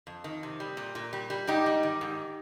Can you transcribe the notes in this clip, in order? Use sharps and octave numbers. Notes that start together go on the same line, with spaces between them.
F2
D#3
C3
G3
A#2
A#2
G3
G3
G#2 D#4 G4
G3
D#3
G#2